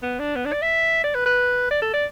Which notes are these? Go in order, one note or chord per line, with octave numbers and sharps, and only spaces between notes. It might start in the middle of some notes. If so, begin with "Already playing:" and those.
B3
D4
B3
D4
D5
E5
D5
B4
B4
D5
A4
D5